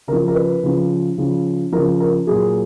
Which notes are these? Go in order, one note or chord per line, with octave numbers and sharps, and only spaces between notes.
C#3 F3 A#4
A#4
B4
C#3 F3
C#3 F3
C#3 F3 A#4
A#4
A#2 F#3 G#4